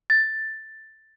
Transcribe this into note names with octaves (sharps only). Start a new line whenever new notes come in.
A6